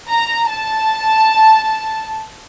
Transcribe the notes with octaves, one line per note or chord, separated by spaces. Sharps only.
A#5
A5